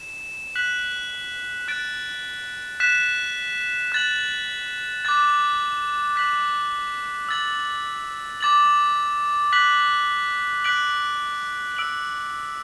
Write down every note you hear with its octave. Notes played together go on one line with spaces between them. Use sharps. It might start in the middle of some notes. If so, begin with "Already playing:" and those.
Already playing: E7
F#6 B6 F#7
F#6 A6 D7
F#6 B6 E7
F#6 A6 F#7
D6 F#6 A6
F#6 B6 F#7
E6 A6 F#7
D6 A6 F#7
F#6 B6 F#7
F#6 B6 D7 F#7
E6 D7 F#7